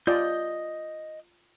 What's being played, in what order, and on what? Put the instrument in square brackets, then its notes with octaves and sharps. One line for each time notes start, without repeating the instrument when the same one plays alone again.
[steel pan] F4 D5 [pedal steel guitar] D#5 G6